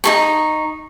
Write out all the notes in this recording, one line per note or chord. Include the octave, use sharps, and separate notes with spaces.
D#4 A4 C#6